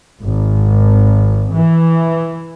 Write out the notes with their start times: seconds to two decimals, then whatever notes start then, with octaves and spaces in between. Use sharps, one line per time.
0.23 G#1
1.55 E3